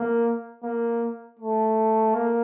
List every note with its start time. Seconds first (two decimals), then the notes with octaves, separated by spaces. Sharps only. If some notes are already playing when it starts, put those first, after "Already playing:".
Already playing: A#3
0.63 A#3
1.39 A3
2.14 A#3